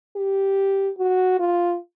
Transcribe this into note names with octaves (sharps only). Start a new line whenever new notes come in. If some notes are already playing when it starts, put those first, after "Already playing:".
G4
F#4
F4